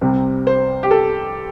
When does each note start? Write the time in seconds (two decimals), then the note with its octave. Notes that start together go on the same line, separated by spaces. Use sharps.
0.01 C2 C3 G3 C4
0.47 C5
0.83 G4
0.91 A4